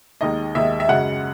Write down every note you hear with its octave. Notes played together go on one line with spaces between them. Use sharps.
D#2 D#3 G#3 D#4 D#5
D#2 D#3 G#3 D#4 E5
E5
F#2 C#3 G#3 F#5